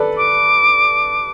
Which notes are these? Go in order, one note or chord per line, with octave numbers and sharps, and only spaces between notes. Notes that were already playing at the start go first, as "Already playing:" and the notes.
Already playing: A4 B4 D5
D6